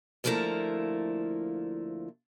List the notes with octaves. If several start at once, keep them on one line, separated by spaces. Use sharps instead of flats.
D2 F3 A3 A#3 E4 A#5